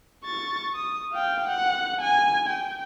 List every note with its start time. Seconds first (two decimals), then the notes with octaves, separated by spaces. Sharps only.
0.25 C#6 A6
0.75 D#6
1.12 F5 G5
1.48 F#5
2.01 G#5
2.49 G5